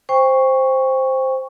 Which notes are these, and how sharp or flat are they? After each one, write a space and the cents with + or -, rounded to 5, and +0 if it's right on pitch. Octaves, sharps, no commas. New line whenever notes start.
C5 +0 G5 +30 C#6 +0